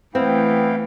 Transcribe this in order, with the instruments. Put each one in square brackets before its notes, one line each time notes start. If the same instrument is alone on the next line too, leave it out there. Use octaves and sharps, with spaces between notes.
[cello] E3 A3 [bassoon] B3 [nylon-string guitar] C4 [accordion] E4 F5 G5